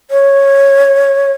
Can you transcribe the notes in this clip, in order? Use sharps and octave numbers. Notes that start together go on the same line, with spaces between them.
C#5